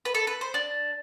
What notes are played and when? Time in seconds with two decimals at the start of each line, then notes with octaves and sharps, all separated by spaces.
0.05 B4
0.15 A4
0.27 B4
0.41 C5
0.54 D4